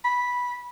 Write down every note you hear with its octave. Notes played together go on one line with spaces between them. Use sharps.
B5